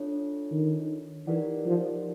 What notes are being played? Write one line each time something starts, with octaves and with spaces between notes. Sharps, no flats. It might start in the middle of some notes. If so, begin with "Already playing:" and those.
Already playing: D4 F4 A4 C#5
D#3
E3 D#4 G4 A#4 D5 F#5
F3